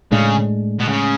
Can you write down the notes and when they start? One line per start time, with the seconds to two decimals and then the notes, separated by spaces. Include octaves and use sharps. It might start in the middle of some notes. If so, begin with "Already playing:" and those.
0.12 A2 C#3 G#3 D4
0.80 B2
0.88 C#3